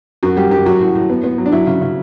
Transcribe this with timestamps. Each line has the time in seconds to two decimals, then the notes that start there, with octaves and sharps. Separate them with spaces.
0.23 F#2 F#4
0.37 G3 G4
0.51 F#2 G4
0.66 F#3 F#4
0.80 A2
0.95 A2
1.10 B3
1.24 B3
1.38 F#3
1.46 D4
1.52 F#3 E4
1.67 C#3
1.81 C#3